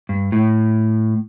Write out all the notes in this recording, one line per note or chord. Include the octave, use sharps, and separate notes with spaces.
G2
A2